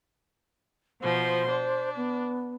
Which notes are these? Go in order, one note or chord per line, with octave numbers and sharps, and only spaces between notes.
B2 F3 C5 C6
D4
B3